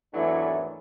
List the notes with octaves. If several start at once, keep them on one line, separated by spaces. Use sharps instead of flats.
G#1 E2 E3 F#3 A3 D4